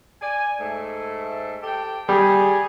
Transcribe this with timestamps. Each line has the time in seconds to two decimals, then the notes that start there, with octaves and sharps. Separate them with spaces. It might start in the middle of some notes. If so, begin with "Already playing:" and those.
0.22 D5 G#5
0.59 G#2 A3
1.63 G4 A4 G5
2.09 G3 G#4